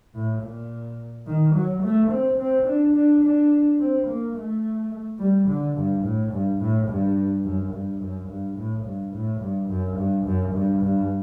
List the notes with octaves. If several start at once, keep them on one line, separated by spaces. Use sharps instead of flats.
A2
A#2
D#3
F#3
A3
C4
C4
D4
D4
D4
C4
A#3
A3
G3
D3
G2
A2
G2
A2
G2
F#2
G2
F#2
G2
A2
G2
A2
G2
F#2
G2
F#2
G2
G2